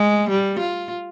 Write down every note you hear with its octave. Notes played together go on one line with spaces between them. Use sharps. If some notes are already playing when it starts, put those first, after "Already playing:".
Already playing: G#3
G3
F4